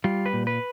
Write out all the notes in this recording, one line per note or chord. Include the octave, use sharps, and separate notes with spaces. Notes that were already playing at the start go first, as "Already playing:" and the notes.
G3 F4
B4
A#2
B4